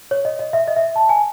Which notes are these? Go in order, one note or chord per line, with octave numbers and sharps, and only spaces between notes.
C#5
D#5
D#5
E5
D#5
E5
A5
G#5